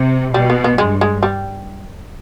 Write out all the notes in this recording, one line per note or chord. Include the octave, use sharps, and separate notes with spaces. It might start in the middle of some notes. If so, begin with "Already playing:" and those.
Already playing: C3
B2 G3
B3
B3
G2 G#3
G#3
G3